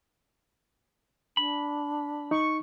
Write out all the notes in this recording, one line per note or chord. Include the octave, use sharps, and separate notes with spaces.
D4 B5
D#4 C#6